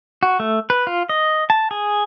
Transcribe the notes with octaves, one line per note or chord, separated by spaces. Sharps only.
F#4
A3
B4
F4
D#5
A5
G#4